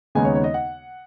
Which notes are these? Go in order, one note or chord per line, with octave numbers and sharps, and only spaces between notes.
D#2 C#3 G#3 B3 D#4 G#5
C#5
C#5
D#5
F#5